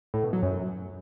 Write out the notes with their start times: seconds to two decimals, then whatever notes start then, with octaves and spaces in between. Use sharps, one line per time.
0.14 A2
0.23 B2
0.33 F#3
0.43 F#2